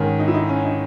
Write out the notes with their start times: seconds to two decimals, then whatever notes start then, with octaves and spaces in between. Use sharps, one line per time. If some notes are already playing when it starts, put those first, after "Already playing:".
Already playing: G#2 D#3 C#4
0.19 D#4
0.28 E4
0.34 D#4
0.49 C#4
0.65 D#4